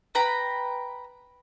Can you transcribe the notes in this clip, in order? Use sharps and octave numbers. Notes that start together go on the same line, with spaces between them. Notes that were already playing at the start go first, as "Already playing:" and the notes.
B4 G5 A#5 B5